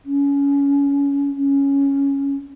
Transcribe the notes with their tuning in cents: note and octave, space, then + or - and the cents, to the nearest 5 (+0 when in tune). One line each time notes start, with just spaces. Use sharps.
C#4 +25
C#4 +0